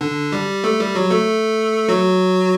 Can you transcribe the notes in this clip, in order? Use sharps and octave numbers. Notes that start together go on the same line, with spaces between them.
D3 D4
G3 G4
A3 A4
G3 G4
F#3 F#4
A3 A4
F#3 F#4